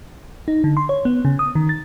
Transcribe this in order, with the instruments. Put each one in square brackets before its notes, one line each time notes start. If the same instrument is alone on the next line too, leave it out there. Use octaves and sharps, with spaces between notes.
[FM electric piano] D#4
D3
C6
C#5
B3
C#3
D#6
D#3
A6